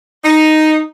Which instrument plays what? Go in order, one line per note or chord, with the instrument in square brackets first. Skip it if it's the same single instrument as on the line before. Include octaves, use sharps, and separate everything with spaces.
[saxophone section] D#4